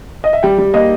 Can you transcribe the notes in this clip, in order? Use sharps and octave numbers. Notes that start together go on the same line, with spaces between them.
D#5
E5
G3 G5
G3
A#3 D#5